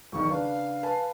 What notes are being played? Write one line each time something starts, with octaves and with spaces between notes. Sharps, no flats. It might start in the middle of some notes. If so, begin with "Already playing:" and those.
B1 E2 D#3 C#6
C#3 D4 B4 F5
B4 G#5 A5